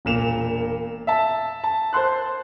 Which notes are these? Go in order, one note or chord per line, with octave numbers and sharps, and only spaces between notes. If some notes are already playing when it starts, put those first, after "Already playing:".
E1 A#2 E7 F7
E5 A5
A5
C5 A5 C6 F#6